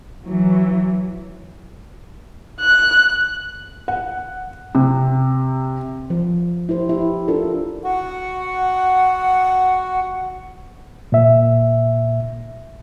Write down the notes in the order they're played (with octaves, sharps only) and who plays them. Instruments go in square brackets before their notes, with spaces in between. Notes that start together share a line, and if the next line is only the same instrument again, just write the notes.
[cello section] E3 F#3
[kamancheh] F#6
[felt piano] F#5
C3
[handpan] F3
E4 G4 C5
E4 G4
D4 E4 F4 A4 A#4 D5
[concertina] F#4 [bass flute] F#5
[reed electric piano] A#2 E5